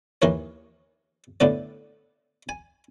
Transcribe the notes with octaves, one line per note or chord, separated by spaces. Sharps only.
D#2 E3 A#4 C#5
A2 D3 B3 D5
G#5